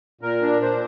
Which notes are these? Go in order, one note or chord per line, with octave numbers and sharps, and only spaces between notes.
A#2 A#4
D4
A#2 C5